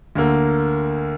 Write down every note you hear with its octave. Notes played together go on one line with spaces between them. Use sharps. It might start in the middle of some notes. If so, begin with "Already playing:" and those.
D2 D3 A#3